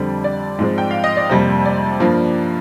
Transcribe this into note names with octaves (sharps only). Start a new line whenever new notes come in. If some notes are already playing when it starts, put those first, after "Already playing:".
Already playing: F2 D3 G3 C4 D5
D5
G#2 F3 G#3 C4
G5
F5
D#5
D5
F2 C3 G3 A#3 C5
D5
G2 F3 A#3